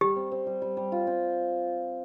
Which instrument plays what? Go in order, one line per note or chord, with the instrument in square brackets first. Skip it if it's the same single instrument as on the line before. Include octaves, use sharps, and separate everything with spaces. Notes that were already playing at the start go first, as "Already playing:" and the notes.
[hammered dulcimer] G3 [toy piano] G4
[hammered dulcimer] C4
C4
G3
G3
G3
F4
C4